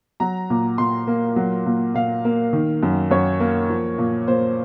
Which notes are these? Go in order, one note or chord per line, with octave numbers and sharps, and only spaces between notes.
F#3 A#5
A#2
A#2 C6
A#3
F#3
A#2
A#2 F5
A#3
D#3
F#2
F#2 C#5
A#3
F3
A#2
A#2 C5